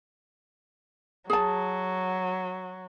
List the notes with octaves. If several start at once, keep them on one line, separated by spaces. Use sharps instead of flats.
F#3 G#4 A5